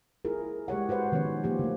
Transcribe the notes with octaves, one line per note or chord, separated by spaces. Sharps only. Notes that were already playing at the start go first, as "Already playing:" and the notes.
E4 F4 G#4 A#4
G#3 G4 C#5 F#5
F#4 B4 C5 F#5
D#3 F3 B3 C#4 C#5
F3 A#3 G4
D3 A3